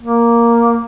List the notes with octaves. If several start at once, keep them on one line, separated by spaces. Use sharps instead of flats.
A#3